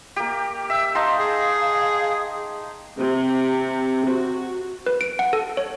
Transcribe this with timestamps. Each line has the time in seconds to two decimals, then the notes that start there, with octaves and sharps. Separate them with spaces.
0.16 A#3 G4
0.70 E5 E6
0.95 D#4 F5 A5 C6
1.19 G#4
2.97 C3
4.08 F#4
4.86 B4
5.01 D7
5.19 F#5
5.33 A4
5.57 C#5